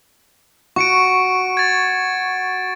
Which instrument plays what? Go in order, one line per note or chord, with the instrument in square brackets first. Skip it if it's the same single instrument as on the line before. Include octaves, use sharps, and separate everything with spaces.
[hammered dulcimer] F#4 [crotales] C#6 C#7 D7
[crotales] G#6 A6